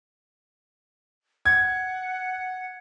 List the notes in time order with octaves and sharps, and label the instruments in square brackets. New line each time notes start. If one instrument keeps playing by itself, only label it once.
[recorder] F#5 [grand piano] G#6